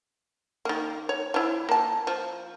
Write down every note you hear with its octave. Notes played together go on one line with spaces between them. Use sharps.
D#3 A#3
C#5
F3 E4
A#3 A5
F3